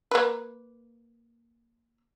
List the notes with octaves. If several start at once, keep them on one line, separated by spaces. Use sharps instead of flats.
A#3 B4